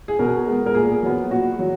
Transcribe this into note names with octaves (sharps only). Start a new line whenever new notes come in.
G#4
B2 A#4
G#3 B3
A#4
A#2 G#4
F#3 B3
A#2 F#4
F#3